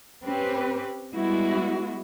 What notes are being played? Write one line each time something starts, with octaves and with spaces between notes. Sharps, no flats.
C4 C#4 G4 B4
G3 G#3 B3 E4 F#4